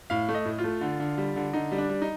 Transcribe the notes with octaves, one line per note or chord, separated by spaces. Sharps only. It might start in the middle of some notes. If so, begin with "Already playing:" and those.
A2 F5
A3
D#5
A2
F4
A3
D3
D3
G3
D3
D3 D#4
G3
D4
G3
D#4